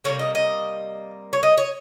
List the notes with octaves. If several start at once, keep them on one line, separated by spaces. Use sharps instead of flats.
C3 D#3 G3 A#3 C#5
D#5
D#5
C#5
D#5
C#5